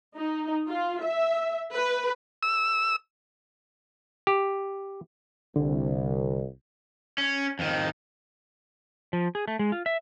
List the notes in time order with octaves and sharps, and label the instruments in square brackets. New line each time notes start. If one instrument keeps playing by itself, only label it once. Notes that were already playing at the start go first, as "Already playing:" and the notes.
[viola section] D#4
F4
E5
B4
[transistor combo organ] E6
[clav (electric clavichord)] G4
[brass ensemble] C2 [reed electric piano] D3
[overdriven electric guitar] C#4
F2 D#3
[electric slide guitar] F3
G#4
A3
G#3
F4
E5